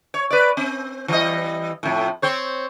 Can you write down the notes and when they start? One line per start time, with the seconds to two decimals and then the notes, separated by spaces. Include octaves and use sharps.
0.14 C#5
0.31 B4 D5
0.57 C4
1.08 E3 G3 D#5
1.83 F2 A2
2.22 C4 C5 C#5